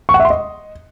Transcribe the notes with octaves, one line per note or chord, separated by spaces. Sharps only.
C#6
F#5
E5
C6
D#5